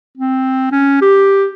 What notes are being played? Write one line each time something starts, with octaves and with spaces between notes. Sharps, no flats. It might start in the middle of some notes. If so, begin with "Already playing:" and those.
C4
C#4
G4